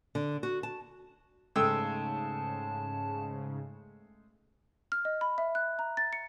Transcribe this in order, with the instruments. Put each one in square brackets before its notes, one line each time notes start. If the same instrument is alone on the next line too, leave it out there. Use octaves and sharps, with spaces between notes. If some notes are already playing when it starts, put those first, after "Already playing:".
[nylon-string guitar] D3
F#4
A5
[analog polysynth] G#2 C#3 [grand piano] G#3 A3 G5 [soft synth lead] A5 [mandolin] E6
[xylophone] F6
D#5
B5
E5
F#6
A#5
A6
C#7